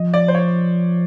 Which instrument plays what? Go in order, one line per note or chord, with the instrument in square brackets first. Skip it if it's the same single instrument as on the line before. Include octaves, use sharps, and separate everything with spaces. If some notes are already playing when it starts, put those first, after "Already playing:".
Already playing: [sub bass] F3 [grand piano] D#5
[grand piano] D5
C5
C#5